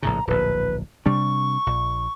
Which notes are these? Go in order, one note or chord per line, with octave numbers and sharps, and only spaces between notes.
A#1 A2 C#3 A#5
D1 A#1 B4
C3 G3 D4 C#6
A#1